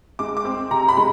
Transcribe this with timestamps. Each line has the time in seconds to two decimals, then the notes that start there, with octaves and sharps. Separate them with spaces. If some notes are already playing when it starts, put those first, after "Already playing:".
0.19 G#3 D6
0.37 D6
0.45 C4
0.71 C3 A#5
0.89 B5
0.97 G#3